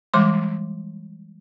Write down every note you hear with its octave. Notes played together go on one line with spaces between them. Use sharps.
E3 G3 G#3 C6 D6